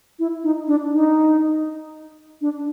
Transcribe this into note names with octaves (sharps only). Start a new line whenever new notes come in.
E4
D#4
D4
D#4
D4